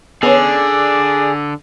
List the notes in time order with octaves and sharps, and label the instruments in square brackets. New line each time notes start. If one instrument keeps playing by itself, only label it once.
[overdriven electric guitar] D3 [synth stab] B3 C#4 [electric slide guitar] G#4 [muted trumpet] D5